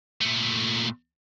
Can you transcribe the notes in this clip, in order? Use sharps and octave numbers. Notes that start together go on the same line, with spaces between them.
A#2 A3